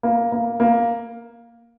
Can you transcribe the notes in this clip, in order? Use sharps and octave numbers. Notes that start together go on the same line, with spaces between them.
A#3
A#3
A#3